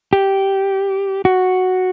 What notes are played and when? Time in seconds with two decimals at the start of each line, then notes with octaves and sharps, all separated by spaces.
0.13 G4
1.25 F#4